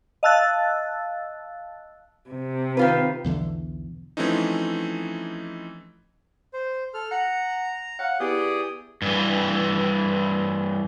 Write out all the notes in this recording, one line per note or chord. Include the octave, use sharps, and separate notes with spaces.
D#5 F5 A5 E6 F#6 A6
C3
D#3 F4 B4
B1 E2 D3 E3
E3 F3 A3 C4 C#4 D#4
C5
A4 F6
F#5 A#5
C#5 F5 F#5
B3 E4 G4 G#4 D5 D#6
G2 E3